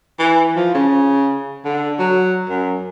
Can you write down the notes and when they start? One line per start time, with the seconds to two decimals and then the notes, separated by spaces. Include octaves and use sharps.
0.19 E3
0.56 F3
0.75 C#3
1.65 D3
1.99 F#3
2.49 F#2